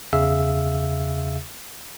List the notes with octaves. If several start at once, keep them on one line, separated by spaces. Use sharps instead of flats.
E2 C#3 G#4 E5 F5 E6